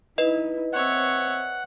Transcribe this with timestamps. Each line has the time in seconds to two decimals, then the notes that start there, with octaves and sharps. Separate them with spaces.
0.18 D#4 E4 B4 D#5
0.73 C4 C5 C#5 E5 F#5